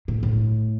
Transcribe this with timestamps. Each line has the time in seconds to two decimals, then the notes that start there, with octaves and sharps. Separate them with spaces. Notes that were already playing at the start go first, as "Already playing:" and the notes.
0.08 A2
0.23 A2